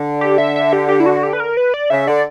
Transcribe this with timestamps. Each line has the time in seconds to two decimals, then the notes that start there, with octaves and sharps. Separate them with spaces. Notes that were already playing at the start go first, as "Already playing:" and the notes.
Already playing: D3
0.21 G4
0.38 E5
0.56 E5
0.73 G4
0.88 G4
1.00 E4
1.06 F#4
1.23 G4
1.33 B4
1.40 A#4
1.57 B4
1.74 D5
1.90 C#3 E5
2.07 D3 D5